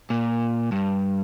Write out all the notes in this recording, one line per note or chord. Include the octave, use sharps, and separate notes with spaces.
A#2
G2